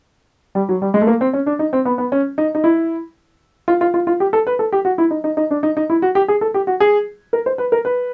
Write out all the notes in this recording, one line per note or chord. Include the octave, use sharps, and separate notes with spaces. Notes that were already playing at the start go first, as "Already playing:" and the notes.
G3
F#3
G3
G#3
A3
A#3
C4
C#4
D4
D#4
C4
B3
B3
C#4
D#4
D#4
E4
F4
F4
F4
F4
G4
A4
B4
A4
G4
F#4
E4
D#4
D#4
D#4
D4
D#4
D#4
E4
F#4
G4
G#4
A4
G4
F#4
G#4
A#4
C5
B4
A#4
B4